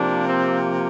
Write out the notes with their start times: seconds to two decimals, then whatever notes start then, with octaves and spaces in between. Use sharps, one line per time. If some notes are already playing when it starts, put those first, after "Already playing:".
Already playing: C3 F3 A#3 D4
0.28 C4